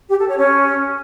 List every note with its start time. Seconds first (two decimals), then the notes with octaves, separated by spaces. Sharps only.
0.09 G4
0.18 A4
0.28 C#5
0.37 C#4